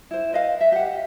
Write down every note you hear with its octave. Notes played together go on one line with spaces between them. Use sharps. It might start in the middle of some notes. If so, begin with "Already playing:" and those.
E4 C5
B4 D#5 F5
E5
G4 F#5